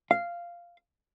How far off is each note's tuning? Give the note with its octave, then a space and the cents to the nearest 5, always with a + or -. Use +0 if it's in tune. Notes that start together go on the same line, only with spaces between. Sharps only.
F5 -10